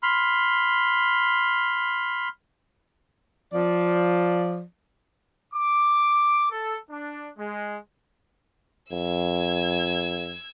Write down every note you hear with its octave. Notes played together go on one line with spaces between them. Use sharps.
B5 C6 F6
F3 D5
D6
A4
D4
G#3
F2 E6 G#6